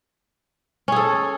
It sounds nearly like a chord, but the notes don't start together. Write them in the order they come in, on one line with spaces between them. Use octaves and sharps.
C#4 G#4 A4